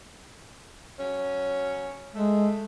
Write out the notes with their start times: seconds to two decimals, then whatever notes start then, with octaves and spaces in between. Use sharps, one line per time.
0.98 F#3 C#4
2.14 G#3 A3